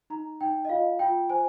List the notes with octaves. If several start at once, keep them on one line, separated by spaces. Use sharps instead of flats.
D#4 A#5
D#4 G5
D#5
F4 F5
F4 G5
C5 G#5